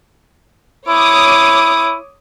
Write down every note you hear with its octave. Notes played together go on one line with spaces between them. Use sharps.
E4 C#5 D6 D#6